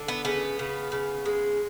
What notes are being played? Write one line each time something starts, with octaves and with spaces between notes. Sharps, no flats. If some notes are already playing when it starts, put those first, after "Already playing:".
Already playing: D3
B3
C#3 B3
C#3
C#3
G#3